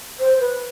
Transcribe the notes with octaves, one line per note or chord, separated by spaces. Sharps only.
C5
B4